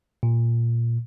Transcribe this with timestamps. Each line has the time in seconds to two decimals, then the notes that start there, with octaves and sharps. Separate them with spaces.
0.23 A#2